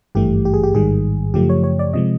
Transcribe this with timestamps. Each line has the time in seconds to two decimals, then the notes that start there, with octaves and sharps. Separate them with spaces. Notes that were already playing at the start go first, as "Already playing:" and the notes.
0.15 G#1 G2 E3 A3 G4
0.45 G4
0.54 G#4
0.63 G4
0.74 A1 G#2 D#3 G3 G#4
1.34 F#2 C#3 F3 A3 G4
1.49 C#5
1.64 C#5
1.79 D5
1.93 C3 F3 G#3 D#5